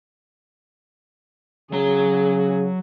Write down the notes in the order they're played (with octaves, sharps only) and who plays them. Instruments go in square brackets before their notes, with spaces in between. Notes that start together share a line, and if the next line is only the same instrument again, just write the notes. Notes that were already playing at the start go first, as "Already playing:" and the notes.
[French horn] C#3 [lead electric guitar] F#3 A#5 [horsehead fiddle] G#4